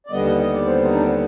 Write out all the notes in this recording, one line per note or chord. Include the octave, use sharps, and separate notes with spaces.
D5
D#2 D3 G3 B3 D#5
D#5
D#5
D5
C5
D#4
D4
C4